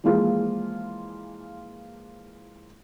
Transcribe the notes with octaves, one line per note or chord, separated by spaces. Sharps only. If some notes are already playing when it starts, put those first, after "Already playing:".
E3 F3 G#3 A#3 F4 G#4